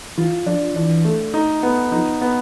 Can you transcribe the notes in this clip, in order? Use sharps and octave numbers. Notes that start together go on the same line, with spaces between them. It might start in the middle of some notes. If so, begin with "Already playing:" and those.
E3 F4
F3 D4
E3 D4
A3
D#4
B3
F3 D#4
B3